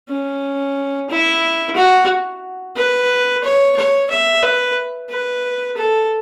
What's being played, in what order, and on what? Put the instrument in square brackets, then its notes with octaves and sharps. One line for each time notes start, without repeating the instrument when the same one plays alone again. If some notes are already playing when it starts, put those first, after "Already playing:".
[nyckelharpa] C#4
E4
F#4
B4
C#5
C#5
E5
B4
B4
A4